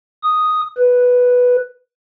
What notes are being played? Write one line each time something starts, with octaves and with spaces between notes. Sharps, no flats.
D#6
B4